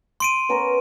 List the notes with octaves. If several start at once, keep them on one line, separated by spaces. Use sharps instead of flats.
C6 D7 D#7
B3 C#4 A#4